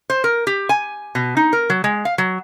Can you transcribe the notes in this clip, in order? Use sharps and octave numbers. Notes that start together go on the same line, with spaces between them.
C5
A#4
G4
G#5
B2
D#4
A#4
F#3
G#3
F5
F#3